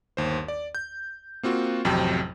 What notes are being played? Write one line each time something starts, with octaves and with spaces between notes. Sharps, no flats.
G1 D#2 C5
D5
G6
A#3 C4 F4 F#4
A1 F2 C3 F#3 G5